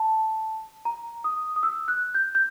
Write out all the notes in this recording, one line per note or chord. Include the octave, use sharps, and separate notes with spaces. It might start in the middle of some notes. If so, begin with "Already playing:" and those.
Already playing: A5
A#5
D#6
D#6
E6
F#6
G6
G6